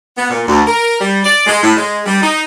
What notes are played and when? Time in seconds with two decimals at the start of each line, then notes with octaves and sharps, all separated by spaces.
0.17 B3
0.30 A#2
0.46 D2
0.66 A#4
0.99 G3
1.23 D5
1.46 G#3
1.62 A2
1.77 G#3
2.05 G3
2.21 D#4